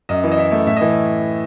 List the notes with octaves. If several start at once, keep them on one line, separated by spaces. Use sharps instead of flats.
F#2 D#5
E3
D#5
E4 E5
A3
A2 E5
D#5
E3